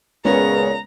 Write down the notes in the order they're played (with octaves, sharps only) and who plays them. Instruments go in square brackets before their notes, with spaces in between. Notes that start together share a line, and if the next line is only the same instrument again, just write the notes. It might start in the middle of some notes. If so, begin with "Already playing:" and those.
[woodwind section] C#2 A#2 C#3 [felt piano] G#3 [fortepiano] B3 C#4 [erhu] A#5